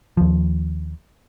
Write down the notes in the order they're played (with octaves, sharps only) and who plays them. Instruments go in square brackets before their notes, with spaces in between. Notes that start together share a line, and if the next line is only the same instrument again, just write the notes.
[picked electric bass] D#2 F3